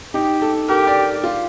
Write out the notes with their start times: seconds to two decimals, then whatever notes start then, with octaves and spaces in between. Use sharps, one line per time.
0.14 D#4 G4
0.42 A4
0.68 G4 A#4
0.87 D5
1.24 F4